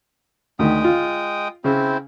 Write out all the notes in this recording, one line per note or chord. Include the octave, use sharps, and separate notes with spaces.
D2 D#3 G#3 G5 D#6
F4
C#3 C4 E4 C5